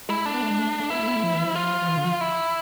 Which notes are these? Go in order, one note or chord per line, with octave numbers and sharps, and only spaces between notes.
G#3 E4
A3 D4
B3
A3
G#3
A3
A3
B3 E4
A3
B3
A3
F3
E3
F3
F4
F3
E3
D3
F3
E4